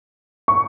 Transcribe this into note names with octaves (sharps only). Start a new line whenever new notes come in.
C#6